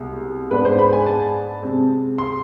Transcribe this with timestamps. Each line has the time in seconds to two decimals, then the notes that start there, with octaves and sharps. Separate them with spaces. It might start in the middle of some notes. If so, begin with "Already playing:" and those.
Already playing: C2 B2 G#3
0.50 G#2 G#3 B3 D4 B4
0.65 C5
0.79 B5
0.93 G#5
1.06 A5
1.62 C3 G#3 C4
2.18 C6